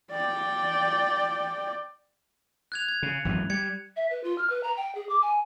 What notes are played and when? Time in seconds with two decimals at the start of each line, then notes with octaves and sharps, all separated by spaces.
0.11 D5 G5
2.72 F#6 G#6 F7
2.88 G#6
3.03 C#3
3.25 G#1 F#2 E3
3.50 G3 G#6 C#7
3.96 E5
4.11 B4
4.24 F4
4.38 F6
4.50 B4
4.63 A#5
4.77 G5
4.95 G#4
5.09 D6
5.22 G#5